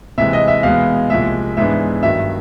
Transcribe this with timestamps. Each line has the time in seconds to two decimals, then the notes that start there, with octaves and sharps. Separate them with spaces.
0.18 C3 E3 G#3 E5
0.33 D#5
0.48 E5
0.63 E2 B2 G#3 B3 F5
1.10 C2 A#2 F3 G#3 E5
1.57 G#2 E3 G#3 B3 D4 E5
2.03 G2 D#3 F#3 E5